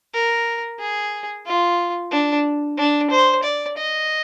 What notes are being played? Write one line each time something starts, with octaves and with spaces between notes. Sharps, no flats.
A#4
G#4
F4
D4
D4
C5
D5
D#5